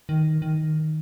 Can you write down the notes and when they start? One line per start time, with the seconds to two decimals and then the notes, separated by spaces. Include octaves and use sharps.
0.09 D#3
0.42 D#3